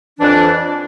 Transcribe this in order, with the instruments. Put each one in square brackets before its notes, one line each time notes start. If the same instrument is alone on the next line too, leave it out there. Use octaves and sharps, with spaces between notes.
[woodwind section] F2 E3 D4